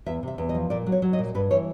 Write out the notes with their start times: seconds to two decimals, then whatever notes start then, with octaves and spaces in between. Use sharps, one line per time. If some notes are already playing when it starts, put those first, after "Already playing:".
0.06 E2 E5
0.23 C3 E5
0.38 E2
0.49 D#5
0.55 F3
0.70 A#2 D5
0.86 F#3
0.92 C#5
1.02 F#3
1.13 D#5
1.19 A#2
1.35 G2 B4
1.51 E3 C#5